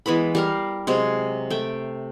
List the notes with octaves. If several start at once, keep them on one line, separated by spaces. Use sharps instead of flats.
E3 G#3 B3 B5
G3 A#4 F5
C3 F#3 G#3
A3 G5